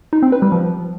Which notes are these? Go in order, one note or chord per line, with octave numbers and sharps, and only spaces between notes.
D#4
C4
B4
G3
F3